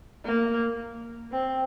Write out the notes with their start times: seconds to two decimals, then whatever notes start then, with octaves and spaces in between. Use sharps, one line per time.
0.25 A#3
1.32 C4